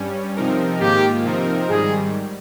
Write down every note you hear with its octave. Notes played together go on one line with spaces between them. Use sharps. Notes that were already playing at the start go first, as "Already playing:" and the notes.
Already playing: G2 G3 C#4
C3 F3 C4 D#4 A#4
G#2 D#3 A#3 F4 G4
C3 F3 C4 D#4 A#4
G#2 D#3 G3 G#4